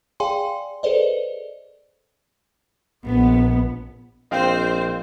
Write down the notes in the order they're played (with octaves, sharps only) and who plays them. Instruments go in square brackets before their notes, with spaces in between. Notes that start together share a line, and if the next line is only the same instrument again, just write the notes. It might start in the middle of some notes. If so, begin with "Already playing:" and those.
[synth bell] G#4 D5 F5 G5 G#5 C6
G#4 A4 B4 C5 D5 D#5
[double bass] A#1 [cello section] B3
[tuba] A#1 [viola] C4 C5 [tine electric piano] D#5 F5 G5